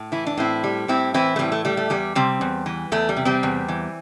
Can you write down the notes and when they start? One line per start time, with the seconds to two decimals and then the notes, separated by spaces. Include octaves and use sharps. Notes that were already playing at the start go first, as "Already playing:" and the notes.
Already playing: A2
0.12 E3 E4
0.27 D4
0.37 A2 C4 E4
0.64 G3
0.88 A2 C4 E4
1.14 E3 C4 E4
1.36 A3
1.39 A2 G3 C4
1.52 A3
1.65 G3 A3
1.77 A3
1.90 E2 G3
2.15 C3 G3 C4
2.41 E2
2.66 E3
2.92 E2 A3
3.09 G3
3.17 C3
3.25 G3 C4
3.43 E2
3.68 E3